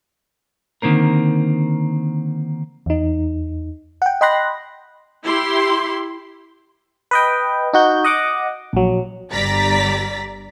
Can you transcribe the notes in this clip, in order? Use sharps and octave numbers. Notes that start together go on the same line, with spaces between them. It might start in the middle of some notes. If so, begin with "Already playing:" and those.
D3 D#3 A#3 C4 A#4
E2 D#4
F#5 G5
D#5 G5 B5 C6 F#6 A#6
E4 G4 C6
B4 D#5 G5
D#4 F#4 G6
D#5 F#5 D6 D#6
A#1 F#3
G1 G3 D5 A#5 A6 B6